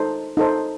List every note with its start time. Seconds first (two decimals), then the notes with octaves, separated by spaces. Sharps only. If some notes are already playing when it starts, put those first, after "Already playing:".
Already playing: D#4 A4 C5
0.37 D#4 A4 C5